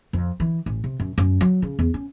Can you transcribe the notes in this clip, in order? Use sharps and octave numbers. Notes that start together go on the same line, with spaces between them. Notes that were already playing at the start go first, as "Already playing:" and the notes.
F2
E3
A1
C3
F#2
F#2
F#3
C#3
E2
C#4